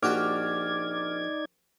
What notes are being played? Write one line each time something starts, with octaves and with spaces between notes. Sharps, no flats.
A#1 D#4 F#4 G4 D5 D6 F6 G#6